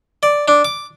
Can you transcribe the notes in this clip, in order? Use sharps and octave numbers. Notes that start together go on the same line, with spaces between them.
D5
D4
D6